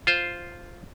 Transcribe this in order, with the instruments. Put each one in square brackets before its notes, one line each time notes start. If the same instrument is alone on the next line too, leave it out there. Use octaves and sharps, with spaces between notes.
[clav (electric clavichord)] F4 C5